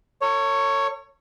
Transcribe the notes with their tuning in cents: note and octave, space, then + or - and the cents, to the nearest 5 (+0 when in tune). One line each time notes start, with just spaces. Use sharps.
A4 +45 C#5 +0